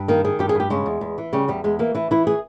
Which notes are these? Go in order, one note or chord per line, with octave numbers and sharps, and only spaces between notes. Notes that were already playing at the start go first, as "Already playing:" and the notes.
Already playing: G2
D#3 A#3
D#3 G#4
G2 G4
G#4
G2 G4
C#3 G#3
E2
E2
E3
C#3 G3
E2 G3
E2 G#3
E3 A#3
E3 E4
E3 E4
G#4